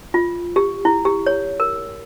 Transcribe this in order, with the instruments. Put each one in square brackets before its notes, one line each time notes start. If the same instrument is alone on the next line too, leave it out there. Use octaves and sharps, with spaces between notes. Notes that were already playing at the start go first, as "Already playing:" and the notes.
[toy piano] F4
G4
E4
G4
C#5
A#4